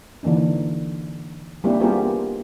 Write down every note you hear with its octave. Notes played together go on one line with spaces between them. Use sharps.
D3 E3 A#3 D4 D#4
G3 A#3 C4 D4 E4 G4
B3 C4 F4 G4 G#4 A#4